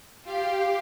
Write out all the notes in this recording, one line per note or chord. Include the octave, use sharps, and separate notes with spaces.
F4 G4 F5